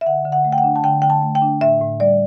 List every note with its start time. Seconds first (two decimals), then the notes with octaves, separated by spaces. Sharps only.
0.01 E5
0.06 D3 F#5
0.25 D3
0.32 F#5
0.45 A3
0.53 G5
0.58 F#5
0.64 D4
0.76 A5
0.84 D3 G5
1.02 D3 G5
1.10 A5
1.22 A3
1.35 G5
1.42 D4
1.61 A2 E5
1.81 A2
2.00 G3 D5